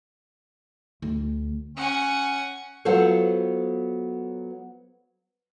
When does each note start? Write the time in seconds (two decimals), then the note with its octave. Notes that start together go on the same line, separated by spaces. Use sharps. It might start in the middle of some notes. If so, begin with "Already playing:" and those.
1.02 D2
1.77 C#4 F#5 G#5
2.85 F#3 B3 F4 A4 C5 C#5